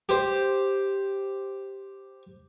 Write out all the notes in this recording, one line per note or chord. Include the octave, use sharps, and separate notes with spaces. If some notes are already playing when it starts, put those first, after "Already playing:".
G4 C5